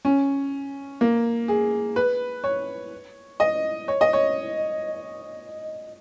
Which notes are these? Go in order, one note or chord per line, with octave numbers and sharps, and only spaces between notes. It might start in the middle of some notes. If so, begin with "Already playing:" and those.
C#4
A#3
G#4
B4
C#5
D#5
C#5
D#5
C#5